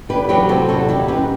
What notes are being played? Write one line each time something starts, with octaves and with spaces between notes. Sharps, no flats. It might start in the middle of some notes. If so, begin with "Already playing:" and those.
E2 G4 B4
F#3 G4 B4
C3 F#4 A4
E2 F#4 A4
D#3 E4 G4
F#2 G4 B4